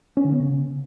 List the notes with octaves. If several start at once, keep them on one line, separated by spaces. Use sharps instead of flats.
C#4
D3
B3
C#3